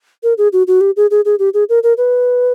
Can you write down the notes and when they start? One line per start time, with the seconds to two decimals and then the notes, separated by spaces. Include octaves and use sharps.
0.23 A#4
0.38 G#4
0.53 F#4
0.67 F#4
0.81 G4
0.97 G#4
1.11 G#4
1.25 G#4
1.39 G4
1.54 G#4
1.69 A#4
1.83 A#4
1.98 B4